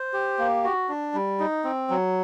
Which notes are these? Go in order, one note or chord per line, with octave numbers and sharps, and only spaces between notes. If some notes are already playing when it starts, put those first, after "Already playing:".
Already playing: C5
G4
A#3
F#4
D4
G3
D#4
C4
F#3